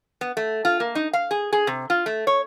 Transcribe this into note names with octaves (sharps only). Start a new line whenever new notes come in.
B3
A3
F4
A#3
D#4
F5
G#4
G#4
C3
F4
A3
C#5